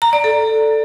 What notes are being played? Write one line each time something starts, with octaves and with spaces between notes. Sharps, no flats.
A#5
D5
A4